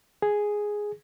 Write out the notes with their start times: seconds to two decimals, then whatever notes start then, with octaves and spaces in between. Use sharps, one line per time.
0.22 G#4